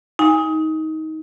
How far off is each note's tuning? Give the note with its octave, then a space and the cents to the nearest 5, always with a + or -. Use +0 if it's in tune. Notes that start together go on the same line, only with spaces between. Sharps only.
D#4 +20 G#5 -25